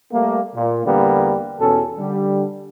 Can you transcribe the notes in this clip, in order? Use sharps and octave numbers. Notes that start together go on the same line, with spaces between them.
G3 A3 A#3
A#2
E2 D3 G3 A#3 B3
E2 B2 C#4 A4
D3 G3